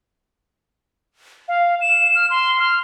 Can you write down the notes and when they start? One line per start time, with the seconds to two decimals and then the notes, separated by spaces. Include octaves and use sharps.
1.48 F5
1.81 E7
2.15 F6
2.30 C6
2.59 F6